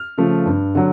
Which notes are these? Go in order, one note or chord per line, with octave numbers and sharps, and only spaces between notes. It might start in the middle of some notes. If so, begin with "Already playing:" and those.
Already playing: F6
C#3 F3 A3
G2
D3 F#3